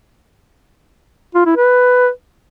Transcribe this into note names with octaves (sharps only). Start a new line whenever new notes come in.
F4
E4
B4